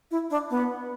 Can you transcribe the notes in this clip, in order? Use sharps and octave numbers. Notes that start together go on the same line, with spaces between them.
E4
D4
B3